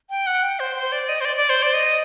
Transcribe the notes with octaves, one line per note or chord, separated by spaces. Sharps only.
G5
F#5
G5
C5
C5
D5
D#5
C5
D5
D5
C5
D5
D#5